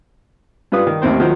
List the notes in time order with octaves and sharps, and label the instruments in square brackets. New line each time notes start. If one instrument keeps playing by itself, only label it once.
[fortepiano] G2 F4 B4 D#6
D#3
A1 D#2 C4 C5
D#3 F3 F#3 C5